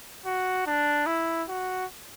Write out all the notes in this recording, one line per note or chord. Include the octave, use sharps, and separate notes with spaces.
F#4
D4
E4
F#4